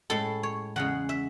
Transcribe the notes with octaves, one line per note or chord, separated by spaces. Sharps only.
A2 G#3 A4
C#5
E2 C#3 G#3 F#5
E5